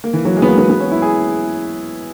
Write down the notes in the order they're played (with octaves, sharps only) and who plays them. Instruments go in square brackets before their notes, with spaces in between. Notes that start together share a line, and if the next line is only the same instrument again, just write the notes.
[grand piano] A#3
E3
F#3
G#3
B3
A#3
B3
B3
C#4
E4
G#4